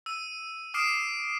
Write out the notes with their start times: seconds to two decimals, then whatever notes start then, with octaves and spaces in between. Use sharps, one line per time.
0.06 E6 D#7
0.74 D6 D#6 F6 C7 D7 E7